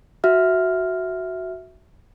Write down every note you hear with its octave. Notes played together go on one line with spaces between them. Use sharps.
F#4 E5 F6